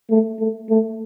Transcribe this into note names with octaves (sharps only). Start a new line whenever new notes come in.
A3
A3
A3